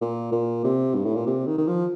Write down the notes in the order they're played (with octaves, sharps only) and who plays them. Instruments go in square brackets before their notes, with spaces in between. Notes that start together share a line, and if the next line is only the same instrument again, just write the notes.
[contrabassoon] A#2
A#2
C3
G2
A2
A#2
C3
D#3
D#3
F3